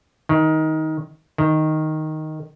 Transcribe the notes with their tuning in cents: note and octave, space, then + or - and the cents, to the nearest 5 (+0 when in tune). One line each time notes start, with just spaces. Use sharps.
D#3 +15
D#3 +0